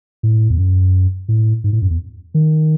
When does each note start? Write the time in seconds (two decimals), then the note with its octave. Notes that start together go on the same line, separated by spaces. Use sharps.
0.23 A2
0.50 E2
0.58 F#2
1.28 A2
1.64 G#2
1.73 A2
1.82 F#2
1.90 E2
2.34 D#3